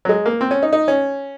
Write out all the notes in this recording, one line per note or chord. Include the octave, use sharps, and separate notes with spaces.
F#3
G#3
A#3
C4
C#4
D#4
D#4
C#4